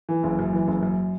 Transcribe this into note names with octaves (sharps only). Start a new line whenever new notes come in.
E3
F#1
F#2
E3
F#1
F#2